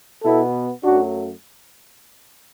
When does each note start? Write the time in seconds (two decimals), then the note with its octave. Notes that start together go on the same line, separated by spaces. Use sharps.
0.23 B2 B3 E4 A4
0.82 F#2 F#3 A3 D4 F#4